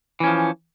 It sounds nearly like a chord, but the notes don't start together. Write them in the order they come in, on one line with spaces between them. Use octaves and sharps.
E3 C#4 F3